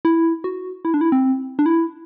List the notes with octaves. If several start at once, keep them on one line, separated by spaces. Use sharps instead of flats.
E4
F#4
E4
D4
E4
C4
D4
E4